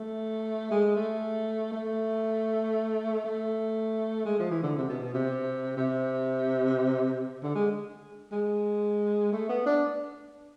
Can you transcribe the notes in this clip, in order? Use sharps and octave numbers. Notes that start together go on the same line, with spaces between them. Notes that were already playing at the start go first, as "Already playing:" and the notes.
Already playing: A3
G#3
A3
A3
A3
G#3
F3
E3
D3
C3
B2
B2
C3
C3
D3
G#3
G#3
A3
B3
D4